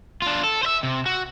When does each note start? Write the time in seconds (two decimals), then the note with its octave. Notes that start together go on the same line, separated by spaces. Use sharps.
0.22 D4 F4
0.44 A4
0.63 C5 E5
0.83 C3
1.06 F#4